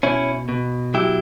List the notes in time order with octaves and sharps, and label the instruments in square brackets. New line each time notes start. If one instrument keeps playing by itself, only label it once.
[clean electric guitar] B2 C#4 E4
B2
F#3 E4 G4